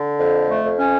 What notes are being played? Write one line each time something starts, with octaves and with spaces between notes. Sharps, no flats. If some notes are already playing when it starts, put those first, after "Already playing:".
Already playing: D3
F2
A3
F2
C#4